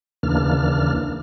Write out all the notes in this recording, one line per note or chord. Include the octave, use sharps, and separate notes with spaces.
D#2 C#3 E3 A#3 D4 F6